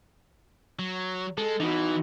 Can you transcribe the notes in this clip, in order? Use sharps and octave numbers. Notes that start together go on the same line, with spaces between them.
F#3
G#3 A4
E3 D#4 F#4